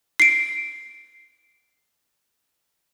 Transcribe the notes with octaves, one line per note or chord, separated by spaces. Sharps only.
C7 D7